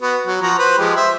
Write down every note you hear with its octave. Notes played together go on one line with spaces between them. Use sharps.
B3 F#4
F#3
F3 F#4 A#5
B4 C5
F3 G#3 G4
C5 E5